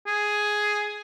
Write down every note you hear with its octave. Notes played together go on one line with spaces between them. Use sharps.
G#4